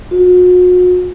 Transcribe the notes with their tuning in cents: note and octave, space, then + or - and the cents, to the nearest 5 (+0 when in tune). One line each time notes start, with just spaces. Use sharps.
F#4 -40